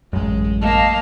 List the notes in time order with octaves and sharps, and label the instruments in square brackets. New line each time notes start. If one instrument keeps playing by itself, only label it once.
[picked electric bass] A1 F#2 [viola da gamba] G#3
[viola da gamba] A#3 [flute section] D#5 F5 A5